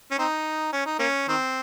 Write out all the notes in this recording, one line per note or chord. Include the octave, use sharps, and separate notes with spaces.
C#4
C4 D#4
C#4
D#4
A#3 C#4
D#3 C4